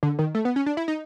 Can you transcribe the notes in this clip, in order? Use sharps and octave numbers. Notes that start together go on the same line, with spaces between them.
D3
D#3
A3
B3
C#4
D4
E4
D#4